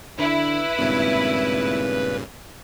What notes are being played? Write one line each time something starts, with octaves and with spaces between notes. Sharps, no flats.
D3 E4 B4
G#1 G2 A#2 C#3